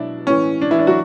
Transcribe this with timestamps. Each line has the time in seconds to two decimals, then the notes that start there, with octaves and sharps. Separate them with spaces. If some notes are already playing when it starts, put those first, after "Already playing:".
Already playing: B2 F#3 D4 E4
0.27 A2 E3 C#4
0.61 D4
0.71 E3 E4
0.79 D4
0.87 F#3 F#4